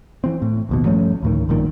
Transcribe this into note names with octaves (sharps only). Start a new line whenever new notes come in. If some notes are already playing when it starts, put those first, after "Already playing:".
E3 C4
A2
A#1 D#2 B2
G2 F3 A3 C#4
D2 A2 D#3
A#1 G2 A#2 D#3